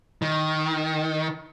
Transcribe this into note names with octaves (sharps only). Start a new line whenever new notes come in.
D#3